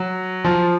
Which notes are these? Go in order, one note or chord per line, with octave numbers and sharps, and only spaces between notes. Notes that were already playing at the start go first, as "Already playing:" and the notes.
Already playing: F#3
F3